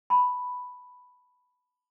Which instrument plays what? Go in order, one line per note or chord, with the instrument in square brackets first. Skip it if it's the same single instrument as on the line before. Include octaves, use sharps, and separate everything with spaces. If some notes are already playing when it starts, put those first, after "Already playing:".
[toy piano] A5 B5